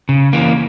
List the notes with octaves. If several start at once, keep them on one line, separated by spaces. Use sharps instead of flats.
C#3
E3 A#3